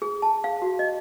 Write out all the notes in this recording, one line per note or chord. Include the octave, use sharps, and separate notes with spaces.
G#4
A5
F5
F#4
D#5